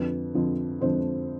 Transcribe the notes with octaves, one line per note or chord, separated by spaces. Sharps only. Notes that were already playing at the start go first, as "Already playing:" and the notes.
Already playing: F2 D3 F3 B4
F2 D3 F3
F2 D3 F3 C5